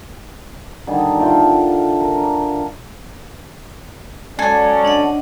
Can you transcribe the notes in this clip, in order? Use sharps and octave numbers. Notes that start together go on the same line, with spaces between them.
D3 D#3 G3 G#4
F4 A4 E5 G5
A#4
D4
F#3 G#3 C#4 A4 D5 G#5
D4 D#5 F#5